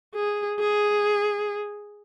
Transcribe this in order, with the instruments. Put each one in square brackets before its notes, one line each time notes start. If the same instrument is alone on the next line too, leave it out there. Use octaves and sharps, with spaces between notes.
[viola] G#4
G#4